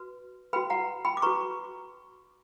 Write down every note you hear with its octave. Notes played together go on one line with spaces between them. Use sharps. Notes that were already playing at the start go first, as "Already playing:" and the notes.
Already playing: F#4 B4
F#4 B4 G5 B5
F#5 A#5
G5 B5
D6
F#4 B4 A#5 C#6